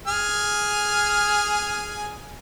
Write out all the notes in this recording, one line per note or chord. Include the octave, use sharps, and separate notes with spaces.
G#4 G#5 F6